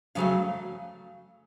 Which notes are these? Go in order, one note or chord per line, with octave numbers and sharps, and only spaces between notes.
F2 C#3 F#3 A3 F5